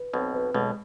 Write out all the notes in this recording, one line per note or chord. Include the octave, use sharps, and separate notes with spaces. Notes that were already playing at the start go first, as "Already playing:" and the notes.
Already playing: B4
B1 B2 C4
B4
B1 B2 G#3